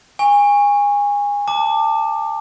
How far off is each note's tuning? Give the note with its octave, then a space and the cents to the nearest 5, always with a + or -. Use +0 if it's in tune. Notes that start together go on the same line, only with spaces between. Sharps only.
G#5 -25 C#6 +0
A5 +20 D6 +20